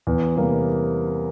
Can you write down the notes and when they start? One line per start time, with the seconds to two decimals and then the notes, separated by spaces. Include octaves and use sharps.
0.07 E2
0.36 C3 G3 A#3